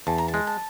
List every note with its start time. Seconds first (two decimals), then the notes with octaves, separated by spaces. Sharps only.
0.07 E2 A5
0.18 A#5
0.28 A5
0.34 G#3
0.47 A5